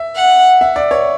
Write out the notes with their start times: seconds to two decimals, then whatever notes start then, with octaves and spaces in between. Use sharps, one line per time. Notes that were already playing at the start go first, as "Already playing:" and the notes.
Already playing: E5
0.16 F#5
0.61 E5
0.76 D5
0.91 C#5